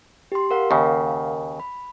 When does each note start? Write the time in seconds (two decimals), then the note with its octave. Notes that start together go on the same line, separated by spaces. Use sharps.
0.32 G4 C6
0.51 A#4 F5 F#5
0.71 D#2 C#3
1.60 B5